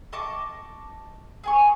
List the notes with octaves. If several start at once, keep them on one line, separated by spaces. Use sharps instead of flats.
D#5 A5 C#6 D6
G#4 G#5 C#6